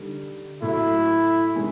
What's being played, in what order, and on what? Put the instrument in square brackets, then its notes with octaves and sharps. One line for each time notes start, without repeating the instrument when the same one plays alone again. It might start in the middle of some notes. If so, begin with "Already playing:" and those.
Already playing: [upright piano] D3 G3 D#4
[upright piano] A2 F#3 A3 [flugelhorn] E4
[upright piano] D#3 G#3 C#4